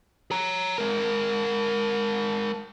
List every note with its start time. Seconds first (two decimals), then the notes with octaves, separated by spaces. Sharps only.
0.31 C#5 A#5
0.78 G#3 A#4